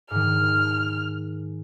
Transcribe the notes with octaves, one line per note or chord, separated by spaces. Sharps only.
G#2 D#3 F6